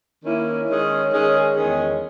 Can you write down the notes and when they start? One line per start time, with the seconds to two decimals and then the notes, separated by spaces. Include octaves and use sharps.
0.24 D#3 A#3 C#4 E4
0.68 D#3 G#3 C#4 G#4
1.11 D#3 G#3 C#4 G#4
1.54 E2 D#3 G#3 C#4 G#4